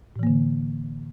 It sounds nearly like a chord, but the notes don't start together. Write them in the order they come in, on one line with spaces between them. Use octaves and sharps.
A2 E3 A#3 D3